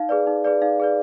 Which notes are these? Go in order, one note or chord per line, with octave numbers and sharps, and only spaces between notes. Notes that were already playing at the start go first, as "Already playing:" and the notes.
Already playing: D#4 F5
G#4 B4 D5
D#4
G#4 B4 D5
D#4 F5
G#4 B4 D5